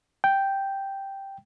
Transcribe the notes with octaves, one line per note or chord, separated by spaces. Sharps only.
G5